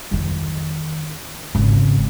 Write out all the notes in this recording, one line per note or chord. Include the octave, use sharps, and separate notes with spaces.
F2 D#3
G#1 C#3